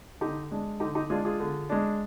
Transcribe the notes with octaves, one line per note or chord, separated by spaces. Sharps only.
D3 D#4 G4
G#3 D4
D3 D#4 G4
D#4 G4
G#3 D4 F4 G#4
F4 G#4
D3
G#3 D4